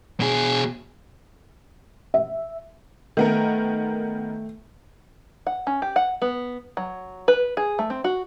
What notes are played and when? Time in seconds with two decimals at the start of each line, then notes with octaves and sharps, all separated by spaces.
0.20 B2 G#4
2.14 E5
3.17 D#3 A3 B3 A#4
5.47 F#5
5.67 C#4
5.82 G4
5.96 F#5
6.22 B3
6.77 F#3
7.28 B4
7.57 G#4
7.79 A3
7.90 C4
8.04 F#4